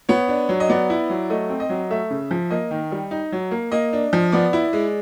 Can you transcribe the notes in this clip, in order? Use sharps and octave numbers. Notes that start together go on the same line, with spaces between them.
B3 C#5
D4
F#3
D#5
B3 D5
E4
F#3
A3 D#5
C4
D#5
F#3
A3 E5
C#3
F3
A#3 D#5
D#3
G3
D#4
F#3
A#3
A#3 D#5
D4
F3
B3 D5
E4
G#3